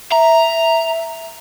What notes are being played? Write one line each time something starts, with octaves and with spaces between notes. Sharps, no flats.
E5 A#5